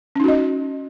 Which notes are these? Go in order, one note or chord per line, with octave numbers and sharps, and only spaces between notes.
C#4 D#4 F#4 D#5